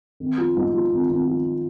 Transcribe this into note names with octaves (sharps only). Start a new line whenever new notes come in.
G#1
F3
G#2
F3
G#1
G#1
F3